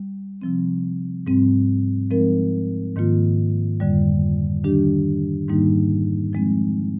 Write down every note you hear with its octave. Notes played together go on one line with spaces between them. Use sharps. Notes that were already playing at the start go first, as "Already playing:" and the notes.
Already playing: G3
C3 F3 C4
G#2 G3 C4
F3 G#3 C4 D#4 A#4
G#2 D#3 A#3 F4
F2 D3 G3
D#3 G3 D4 G4
G#2 D#3 G3 A#3 D#4
F3 G#3 C4